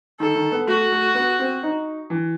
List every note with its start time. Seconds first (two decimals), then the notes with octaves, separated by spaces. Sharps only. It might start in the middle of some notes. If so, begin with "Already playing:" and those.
0.20 D#3 A4
0.36 D#3
0.52 B3
0.67 A3 F#4
0.92 A3
1.15 B3
1.39 C4
1.63 D#4
2.10 E3